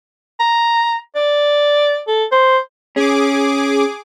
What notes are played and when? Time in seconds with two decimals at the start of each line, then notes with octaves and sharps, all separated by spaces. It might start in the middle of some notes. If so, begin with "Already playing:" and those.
0.40 A#5
1.16 D5
2.08 A4
2.32 C5
2.96 C#4 G#4 D6